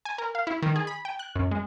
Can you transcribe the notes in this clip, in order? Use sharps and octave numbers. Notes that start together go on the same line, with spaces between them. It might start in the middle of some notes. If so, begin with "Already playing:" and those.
G#5
A#4
F5
E4
D#3
G#4
B5
G5
F#6
F#2
G#3